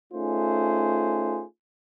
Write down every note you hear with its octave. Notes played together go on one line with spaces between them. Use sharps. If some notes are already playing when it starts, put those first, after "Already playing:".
A3 C#4 D#4 F4 G#4 C5